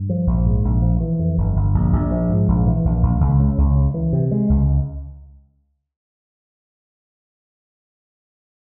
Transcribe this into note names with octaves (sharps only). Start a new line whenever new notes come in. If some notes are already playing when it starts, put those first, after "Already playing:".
Already playing: G2
F3
A#1
G#2
A#1
F3
E3
F2
G1
G1
A#1
A#1
F3
G#2
A#1
E3
A#1
A#1
C#2
C#3
C#2
C#3
E3
C3
G#3
C#2